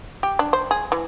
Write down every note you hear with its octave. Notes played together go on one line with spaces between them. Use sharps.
G4
D4
C5
G#4
E3